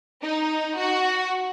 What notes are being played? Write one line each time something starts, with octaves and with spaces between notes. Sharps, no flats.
D#4
F#4